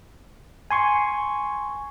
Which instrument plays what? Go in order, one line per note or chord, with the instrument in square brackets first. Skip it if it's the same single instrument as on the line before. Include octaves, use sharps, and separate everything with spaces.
[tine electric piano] G#5 C6 C#6